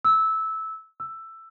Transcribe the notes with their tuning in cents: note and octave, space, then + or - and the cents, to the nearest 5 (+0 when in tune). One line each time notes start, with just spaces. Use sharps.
E6 -15
E6 +10